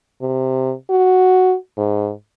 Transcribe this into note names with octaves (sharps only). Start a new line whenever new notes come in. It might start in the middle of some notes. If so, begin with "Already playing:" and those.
C3
F#4
G#2